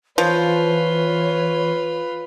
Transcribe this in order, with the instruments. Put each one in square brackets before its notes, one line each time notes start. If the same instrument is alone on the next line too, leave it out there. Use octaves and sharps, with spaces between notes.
[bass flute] E3 [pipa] F3 [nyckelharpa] F4 B4 [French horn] C#5